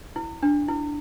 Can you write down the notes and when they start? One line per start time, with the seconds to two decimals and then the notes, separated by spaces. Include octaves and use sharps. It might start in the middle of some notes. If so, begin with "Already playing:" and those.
0.16 E4
0.43 D4
0.68 E4